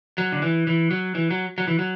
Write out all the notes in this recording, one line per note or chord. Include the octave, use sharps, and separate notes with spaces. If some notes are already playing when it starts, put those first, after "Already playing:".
F#3
D3
E3
E3
F#3
E3
F#3
F#3
E3
F#3